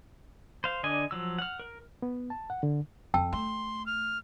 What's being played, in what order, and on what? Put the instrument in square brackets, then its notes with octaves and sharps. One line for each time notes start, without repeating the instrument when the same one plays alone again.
[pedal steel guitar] C5 F5
D3 D4 D#5 G#5
F3 F#3 E6
F#5 F6
A#4
[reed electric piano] B3
A5
F#5
D3
[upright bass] F2 [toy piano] G5 A5 E6
[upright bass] A3 [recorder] C6
[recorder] F6